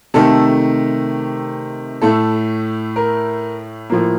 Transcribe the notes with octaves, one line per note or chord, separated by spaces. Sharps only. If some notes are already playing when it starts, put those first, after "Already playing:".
C3 D#3 A3 A4
A2 A3 A4
A#4
A2 F3 A#3